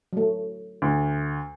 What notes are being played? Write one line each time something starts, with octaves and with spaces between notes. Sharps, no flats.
F#3 A3
D2